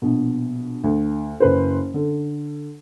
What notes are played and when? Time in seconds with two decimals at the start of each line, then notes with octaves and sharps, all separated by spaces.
0.02 A#1 B2
0.84 D2
1.40 F#1 B4 C5
1.94 D3